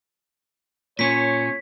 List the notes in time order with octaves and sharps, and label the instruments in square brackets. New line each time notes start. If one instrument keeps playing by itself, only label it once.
[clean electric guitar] A#2 C#4 [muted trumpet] C#5 [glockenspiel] B6